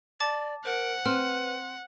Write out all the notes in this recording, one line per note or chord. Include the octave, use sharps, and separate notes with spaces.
D5 A5 D6 A6
A#4 C5 F#5
C4 B4 F6